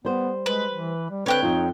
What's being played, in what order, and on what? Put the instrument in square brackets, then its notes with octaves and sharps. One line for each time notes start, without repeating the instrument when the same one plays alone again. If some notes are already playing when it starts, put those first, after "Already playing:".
[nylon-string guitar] G3 C5 [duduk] B3
[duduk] G#3 [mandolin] B4
[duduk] E3
G3
[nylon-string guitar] D3 C4 [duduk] B4 [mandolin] C#5 G5 F#6
[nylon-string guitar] F2 F4 [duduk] D#4